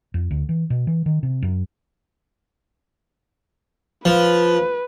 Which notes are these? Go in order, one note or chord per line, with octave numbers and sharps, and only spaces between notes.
F2
D2
E3
B2
E3
D#3
C3
F#2
F3 B4